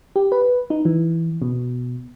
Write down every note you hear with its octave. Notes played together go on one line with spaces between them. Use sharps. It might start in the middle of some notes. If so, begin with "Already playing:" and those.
G4
B4
D#4
E3
B2